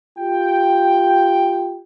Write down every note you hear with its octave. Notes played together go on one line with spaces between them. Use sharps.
F4 G4 G5